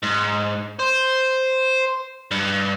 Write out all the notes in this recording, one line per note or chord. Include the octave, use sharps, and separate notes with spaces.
G#2
C5
G2